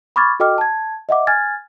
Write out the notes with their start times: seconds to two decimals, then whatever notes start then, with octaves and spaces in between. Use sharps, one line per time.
0.16 B5 C#6 D6 F6 G#6 A6
0.40 F#4 A4 D#5 G5 D6 F6
0.58 A5 G#6
1.09 D#5 E5 F#5 D6
1.27 G#5 F6 G#6 A6